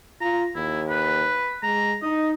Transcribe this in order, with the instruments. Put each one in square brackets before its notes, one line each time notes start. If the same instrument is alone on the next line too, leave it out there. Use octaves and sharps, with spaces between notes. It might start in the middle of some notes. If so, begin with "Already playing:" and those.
[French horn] F4 [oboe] A#5
[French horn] D#2 [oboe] E4
[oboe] B4
[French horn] G#3 [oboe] A#5
[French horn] D#4 [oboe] D#5